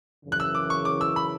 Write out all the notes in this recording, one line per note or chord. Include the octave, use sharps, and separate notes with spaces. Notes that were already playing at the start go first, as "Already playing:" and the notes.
F#2 C#3 E3
F#6
E6
D6
C#6
D6
E6
B5